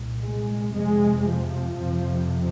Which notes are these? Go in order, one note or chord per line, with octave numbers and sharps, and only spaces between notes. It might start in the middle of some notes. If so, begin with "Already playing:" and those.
Already playing: C2 A#2
G#3
F2 C3 G#3
F3
F2 C3